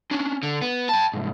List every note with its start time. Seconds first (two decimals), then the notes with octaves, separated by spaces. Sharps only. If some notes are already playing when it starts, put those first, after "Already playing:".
0.11 C#4 D4
0.43 D3
0.62 B3
0.89 G5 A5
1.13 C2 G#2